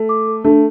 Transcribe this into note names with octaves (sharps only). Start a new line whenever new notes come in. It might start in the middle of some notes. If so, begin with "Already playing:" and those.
Already playing: A3
D6
A4
A3 D4